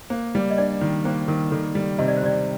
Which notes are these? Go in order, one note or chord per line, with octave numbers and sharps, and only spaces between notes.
A#3 C5
G3
D#5
D4 D5
D#3
A#3 C5
D#3 A#4
D#3 A4
G3
C3 D#5
D5
C5
C3 D5